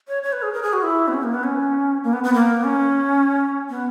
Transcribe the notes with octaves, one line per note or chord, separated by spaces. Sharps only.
C#5
C#5
B4
G#4
A#4
G#4
F#4
E4
B3
C#4
A#3
B3
C#4
A#3
B3
B3
A#3
C#4
B3